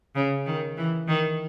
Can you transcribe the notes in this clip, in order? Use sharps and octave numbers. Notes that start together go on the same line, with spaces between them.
C#3
D#3
E3
D#3